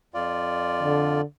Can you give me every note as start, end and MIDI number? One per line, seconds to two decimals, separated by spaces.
0.14 1.21 41
0.14 1.21 65
0.14 1.21 74
0.82 1.23 50